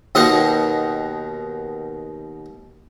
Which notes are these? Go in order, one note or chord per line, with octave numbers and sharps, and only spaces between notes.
D#2 B2 D#3 D#5 F#5 C6